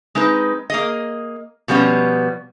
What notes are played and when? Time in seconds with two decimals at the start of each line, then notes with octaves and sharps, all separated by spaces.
0.15 G#3 C4 D#4 B4
0.70 A#3 G#4 D#5
1.68 B2 F3 G3 B3 C#4